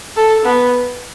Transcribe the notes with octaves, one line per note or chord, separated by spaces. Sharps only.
A4
B3